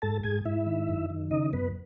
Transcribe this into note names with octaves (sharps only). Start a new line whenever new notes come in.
G#2 A4 A5
G#2 G#4 G#5
G#2 E4 E5
D#3
F#2
D#3
C#3 D#4 D#5
F#2 B3 B4